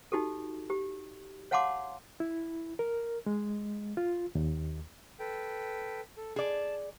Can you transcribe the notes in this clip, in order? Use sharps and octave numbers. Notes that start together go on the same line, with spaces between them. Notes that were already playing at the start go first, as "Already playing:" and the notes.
D#4 F#4 G4 A4
G4
C#5 F5 F#5 A5 C6 D6
E4
A#4
G#3
F4
D#2
A4 B4 G5
A4
G#4 D5 A5